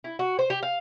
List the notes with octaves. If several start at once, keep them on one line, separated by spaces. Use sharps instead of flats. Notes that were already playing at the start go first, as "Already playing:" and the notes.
E4
F#4
C5
G4
F5